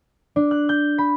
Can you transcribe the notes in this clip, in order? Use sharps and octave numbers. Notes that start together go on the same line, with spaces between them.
D4
F#6
G6
B5